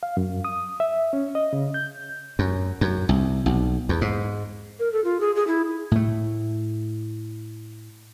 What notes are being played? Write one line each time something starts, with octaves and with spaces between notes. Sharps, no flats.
F5
F#2
D#6
E5
C#4
D#5
C#3
G6
F#2
F#2
C2
B1
E2
G#2
A#4
A4
F4
G#4
G#4
E4
A2 A3